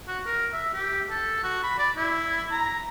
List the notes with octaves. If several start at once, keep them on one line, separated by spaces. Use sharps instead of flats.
F#4
A#4
E5
G4
A4
F#4
B5
D5
E4
A#5